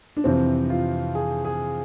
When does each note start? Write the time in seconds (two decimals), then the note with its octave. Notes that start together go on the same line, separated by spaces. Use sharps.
0.17 D4
0.24 F2 C3 E3 C4
0.70 F4
1.15 G#4
1.45 G#4